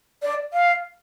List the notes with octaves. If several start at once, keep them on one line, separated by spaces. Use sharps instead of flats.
D5
F5